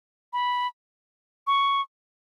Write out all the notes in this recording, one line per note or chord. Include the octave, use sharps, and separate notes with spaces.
B5
C#6